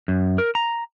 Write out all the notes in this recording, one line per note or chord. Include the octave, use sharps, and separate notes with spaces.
F#2
A#4
A#5